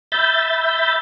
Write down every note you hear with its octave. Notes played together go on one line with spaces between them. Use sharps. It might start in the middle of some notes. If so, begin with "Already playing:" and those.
E5 B5 G6 A6